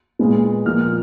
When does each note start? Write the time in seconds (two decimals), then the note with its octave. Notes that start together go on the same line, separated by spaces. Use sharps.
0.19 A#2 G#3 B3
0.65 A#2 F3 A#3 F6
0.81 F6